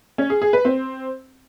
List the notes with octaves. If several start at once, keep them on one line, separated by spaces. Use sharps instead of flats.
C#4
G#4
G#4
B4
C4